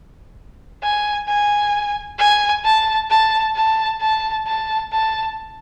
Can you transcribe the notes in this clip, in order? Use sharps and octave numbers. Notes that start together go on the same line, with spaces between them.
G#5
G#5
G#5
A5
A5
A5
A5
A5
A5